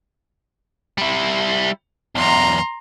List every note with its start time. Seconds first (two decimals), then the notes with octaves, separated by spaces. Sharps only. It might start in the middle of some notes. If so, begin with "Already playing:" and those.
0.98 G3 E4
2.15 B1 E2 A#5 C6